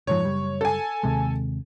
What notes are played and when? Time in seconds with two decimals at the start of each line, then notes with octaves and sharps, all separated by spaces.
0.07 F#1 G#2 F3 C#5
0.25 F#1 G3
0.61 A4 G#5
1.03 D#2 C3 G#3